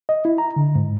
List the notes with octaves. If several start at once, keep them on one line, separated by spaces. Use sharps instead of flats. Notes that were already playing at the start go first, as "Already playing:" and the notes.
D#5
E4
A#5
D3
G#2